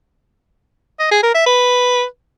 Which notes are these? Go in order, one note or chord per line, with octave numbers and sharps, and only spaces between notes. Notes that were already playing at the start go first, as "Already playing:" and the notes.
D#5
G#4
A#4
E5
B4